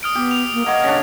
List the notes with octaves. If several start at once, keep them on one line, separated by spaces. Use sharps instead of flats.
D#6 F6 D7
B3 G4
F7
A#3
A#3 C#5 D#5 F#5
C#3 D4